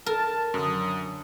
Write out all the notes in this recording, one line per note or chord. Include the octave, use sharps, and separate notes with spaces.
A#4 A5
F#2 D3 F#3 D#6